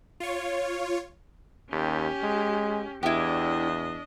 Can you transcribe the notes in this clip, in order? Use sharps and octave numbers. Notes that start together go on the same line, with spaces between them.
F4 C#5
D#2 C#4 G4
G#3
E2 D4 E4 G4 D#5